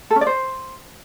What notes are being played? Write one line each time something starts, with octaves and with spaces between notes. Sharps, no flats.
A4
C#4
D5
C5